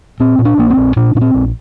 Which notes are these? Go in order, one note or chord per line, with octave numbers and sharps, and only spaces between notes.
A#2 C4
A#2
D4
A#1 A#3
C4
A#1
A#2 D4
A#2 D4
C4
A#1